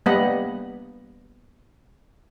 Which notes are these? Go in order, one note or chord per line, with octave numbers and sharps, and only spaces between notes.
G3 A#3 B3 D#5 F#5 B5